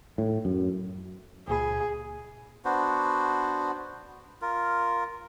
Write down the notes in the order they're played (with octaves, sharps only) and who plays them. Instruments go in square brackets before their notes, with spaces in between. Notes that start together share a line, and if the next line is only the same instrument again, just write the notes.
[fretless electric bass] A2
F#2
[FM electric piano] C#2 A#2 B5 [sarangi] G#4
[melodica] B3 D4 F#4 C5
F4 A#4